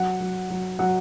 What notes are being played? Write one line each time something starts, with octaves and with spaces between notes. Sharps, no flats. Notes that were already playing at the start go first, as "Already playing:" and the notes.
Already playing: F#3 F#5
F#3
F#3
F#3 F#5